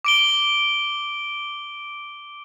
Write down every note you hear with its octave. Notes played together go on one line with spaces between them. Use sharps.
D6 D7 G7